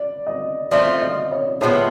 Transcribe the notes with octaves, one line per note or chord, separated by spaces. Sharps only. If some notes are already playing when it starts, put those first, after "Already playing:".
Already playing: D5
D#5
F3 A3 C4 F4 D5
D#5
C#5
A2 F3 G#3 B3 C#5